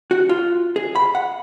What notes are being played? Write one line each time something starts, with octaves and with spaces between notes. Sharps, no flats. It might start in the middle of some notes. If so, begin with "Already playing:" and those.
F#4
F4
G#4
B5
F#5